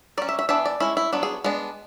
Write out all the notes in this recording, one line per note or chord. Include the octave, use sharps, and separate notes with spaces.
F#3 C#4 D5
E5
E5
E3 B3 D4 E5
D5
G#3 C#4 E4
E4
F#3 B3 D4
G#4
G#3 B3 D4